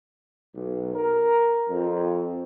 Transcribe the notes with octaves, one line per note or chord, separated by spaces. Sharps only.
B1
A#4
F2